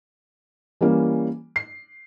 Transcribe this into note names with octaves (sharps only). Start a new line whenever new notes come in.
E3 G3 A#3 C#4
C7